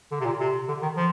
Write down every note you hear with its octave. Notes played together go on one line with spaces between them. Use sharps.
D3
C3
A#2
C3
D3
D#3
F3